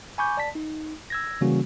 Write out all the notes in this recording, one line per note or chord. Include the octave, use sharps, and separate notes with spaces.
G#5 B5 C#6 D6 G6
D5 A5 B6
D#4
E6 G#6 A#6
C#3 E3 G3 A#3 C#4 F#4